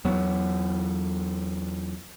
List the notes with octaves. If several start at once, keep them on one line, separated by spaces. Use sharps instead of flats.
E2 F#3 B3